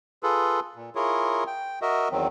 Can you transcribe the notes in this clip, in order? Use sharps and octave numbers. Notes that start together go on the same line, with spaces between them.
F4 G#4 A4 B4
A#2
E4 F4 G#4 A#4 C#5
G5
F#4 A#4 D#5 E5
E2 D#3 F#3 C4